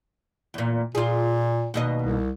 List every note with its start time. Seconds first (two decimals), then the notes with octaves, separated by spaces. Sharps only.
0.54 E2 A#2
0.95 A#2 F4 G#4
1.74 D#2 B2 D#5
2.02 C2